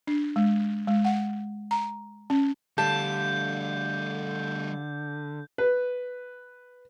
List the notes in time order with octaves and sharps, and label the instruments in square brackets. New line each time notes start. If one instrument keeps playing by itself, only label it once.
[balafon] D4
G#3
G#3
F#5
A#5
C#4
[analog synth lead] D3 [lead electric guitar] G3 A3 [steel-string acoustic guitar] G4 F5 A5 [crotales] G6
[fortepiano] B4